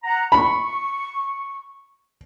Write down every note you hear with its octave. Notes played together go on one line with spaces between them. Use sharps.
F#5 A#5
B5 C#6